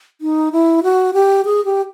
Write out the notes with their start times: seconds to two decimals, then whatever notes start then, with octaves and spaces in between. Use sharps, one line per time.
0.21 D#4
0.52 E4
0.83 F#4
1.14 G4
1.45 G#4
1.65 G4